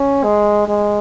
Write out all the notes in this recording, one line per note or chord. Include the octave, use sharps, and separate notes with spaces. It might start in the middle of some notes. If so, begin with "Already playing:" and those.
Already playing: C#4
G#3
G#3